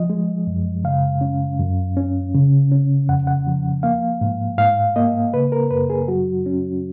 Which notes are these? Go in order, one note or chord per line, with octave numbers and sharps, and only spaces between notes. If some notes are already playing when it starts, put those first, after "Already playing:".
Already playing: F3 D#5
G#3
F#2
C#3 F5
C#4
F#2
C#4
C#3
C#4
F2 F#5
F#5
F3
A#3 F5
G#2
G#2 F5
A#3 D#5
C#3 B4
A#4
F#2 B4
G#4
F#3 F#4
C#4